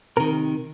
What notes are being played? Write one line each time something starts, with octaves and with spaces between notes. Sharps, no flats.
C3 D#3 A#4